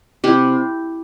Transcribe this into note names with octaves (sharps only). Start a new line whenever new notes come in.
C3 E4 G4